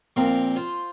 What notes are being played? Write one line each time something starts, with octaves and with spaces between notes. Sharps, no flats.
A#2 F3 C4 A#4 F5 C6
F4 C5